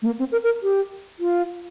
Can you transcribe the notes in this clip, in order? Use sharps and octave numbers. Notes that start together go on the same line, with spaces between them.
A3
A#3
C4
A#4
A#4
G4
F4